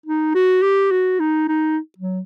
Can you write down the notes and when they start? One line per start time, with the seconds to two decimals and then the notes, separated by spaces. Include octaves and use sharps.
0.06 D#4
0.35 F#4
0.62 G4
0.91 F#4
1.20 D#4
1.48 D#4
1.98 F#3